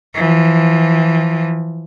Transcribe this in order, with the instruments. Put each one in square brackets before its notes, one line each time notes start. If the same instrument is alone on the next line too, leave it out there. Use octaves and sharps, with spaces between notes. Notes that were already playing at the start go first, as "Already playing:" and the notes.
[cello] E3 F3